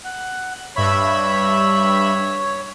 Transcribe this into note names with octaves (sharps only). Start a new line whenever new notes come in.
F#5
G2 C#5 E5 B5